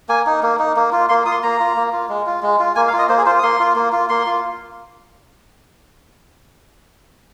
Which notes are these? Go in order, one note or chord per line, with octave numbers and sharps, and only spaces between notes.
A#3 G#5
D#4
A#3
D#4
A#3
F4
A#3 C6
F4 D#6
C6
A#3 A#5
F4
A#3
F4
G#3
F4
G#3
F4
A#3 G#5
F5
F4
D#5
A#3 C5
G#4
F4 C5
D#6
A#3 C6
F4
A#3
F4
A#3 C6
F4